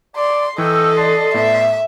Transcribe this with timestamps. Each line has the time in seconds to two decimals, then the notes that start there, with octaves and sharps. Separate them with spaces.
0.16 D5 C6
0.58 E3 A4 D#5 G5 C#6 E6
0.97 D5 A5 C6
1.34 A2 B3 E5